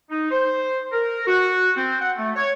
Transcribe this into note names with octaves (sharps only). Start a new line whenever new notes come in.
D#4
C5
A#4
F#4
C4
F#5
A3
C#5